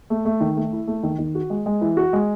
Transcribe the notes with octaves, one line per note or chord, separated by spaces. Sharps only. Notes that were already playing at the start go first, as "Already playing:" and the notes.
A3
A3
D#3
A3
E4
A3
D#3
D#3
F#4
G#3
G#3
E3
F#4
G#3